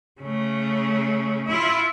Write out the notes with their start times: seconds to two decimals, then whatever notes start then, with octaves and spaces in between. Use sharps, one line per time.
0.21 C#3 A3
1.47 E4 F4